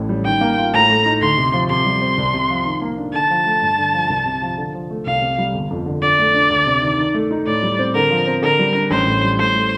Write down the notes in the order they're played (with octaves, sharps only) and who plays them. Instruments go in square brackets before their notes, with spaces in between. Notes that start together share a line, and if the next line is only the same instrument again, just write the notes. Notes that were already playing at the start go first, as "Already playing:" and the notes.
Already playing: [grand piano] A1 A2
G3
[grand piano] D#3 [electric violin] G5
[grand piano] A#3
F4
[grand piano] A2 [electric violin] A#5
[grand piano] A3
D#4
[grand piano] D2 [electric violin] C6
[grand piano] C3
F3
[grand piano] C3 [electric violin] C6
[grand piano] G3
C4
C2
C3
F3
D#3
A#3
D4
[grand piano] D3 [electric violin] A5
[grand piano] F3
A3
G2
D3
F3
C2
C3
F3
D3
F3
A3
[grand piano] C2 [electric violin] F5
[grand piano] C3
G3
G1
F2
D3
[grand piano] D3 [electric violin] D5
[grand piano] A3
D4
D2
C3
D#3
D#3
A3
D#4
[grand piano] A2 [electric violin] D5
[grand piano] G3
C4
[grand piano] D3 [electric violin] A#4
[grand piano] F3
C4
[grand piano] D3 [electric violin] A#4
[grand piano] G3
D4
[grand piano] A1 [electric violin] C5
[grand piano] A2
G3
[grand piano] A2 [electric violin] C5
[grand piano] A3